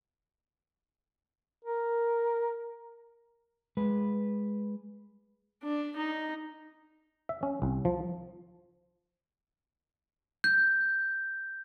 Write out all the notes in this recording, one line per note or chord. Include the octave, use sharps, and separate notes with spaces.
A#4
G#3 B4
D4
D#4
E5
C#4
C2
F3
G6